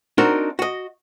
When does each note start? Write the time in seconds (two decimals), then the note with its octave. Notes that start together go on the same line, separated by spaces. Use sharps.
0.18 C4 D4 D#4 F#4 A#4
0.59 F#4 D#5